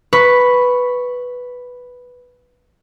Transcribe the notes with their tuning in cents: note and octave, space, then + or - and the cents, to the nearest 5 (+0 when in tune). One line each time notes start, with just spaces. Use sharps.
B4 +0 C#6 +0